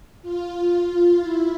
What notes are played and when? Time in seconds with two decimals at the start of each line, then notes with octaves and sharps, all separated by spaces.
0.22 F4
1.19 E4